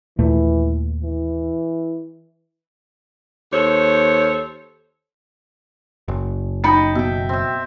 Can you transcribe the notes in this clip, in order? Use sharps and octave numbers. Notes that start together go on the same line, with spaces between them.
D#2 A#2 E3 A3
E3
D#2 A4 C5 C#5
F#1
D#4 D#5 G5 A5 B5 C#7
B2 E5 G5
C4 E5